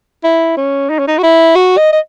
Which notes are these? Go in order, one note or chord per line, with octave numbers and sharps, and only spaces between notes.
E4
C#4
D#4
C#4
D#4
F#4
E4
F#4
D#5
D#5